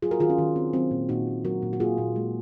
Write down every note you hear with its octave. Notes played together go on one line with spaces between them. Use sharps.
F#3 F4 G#4
F#4 A#4
D#3 F4 G#4
C#4
D#3
C4
F#3 C4
A#2
A#2 D#4 F#4
A#2
F#3 F#4 A#4
A#2
F#4
A#3 F4 G#4
A#2
G#3